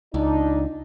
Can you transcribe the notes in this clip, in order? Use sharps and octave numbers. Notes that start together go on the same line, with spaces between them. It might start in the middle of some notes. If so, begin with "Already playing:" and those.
C#2 D4 D#4